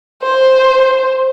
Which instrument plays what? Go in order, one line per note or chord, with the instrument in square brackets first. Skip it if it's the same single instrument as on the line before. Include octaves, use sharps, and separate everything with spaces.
[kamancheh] C5